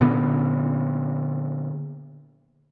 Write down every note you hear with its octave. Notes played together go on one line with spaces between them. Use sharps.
A#2 D3 B3